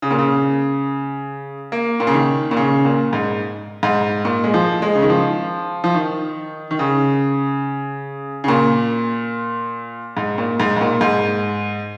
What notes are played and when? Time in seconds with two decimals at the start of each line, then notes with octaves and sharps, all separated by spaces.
0.02 C#3
0.11 A#2
0.19 C#3
1.72 A#3
2.00 A#2
2.07 C#3
2.14 D#3
2.51 A#2
2.57 C#3
2.85 A#2
3.13 G#2
3.83 G#2
4.25 A#2
4.44 G#3
4.54 F3
4.82 G#3
4.95 C#3
5.02 D#3
5.09 F3
5.84 F3
5.94 D#3
6.71 D#3
6.79 C#3
8.44 C#3
8.48 A#2
10.17 G#2
10.38 A#2
10.60 G#2
10.76 G#2
10.81 A#2
11.01 G#2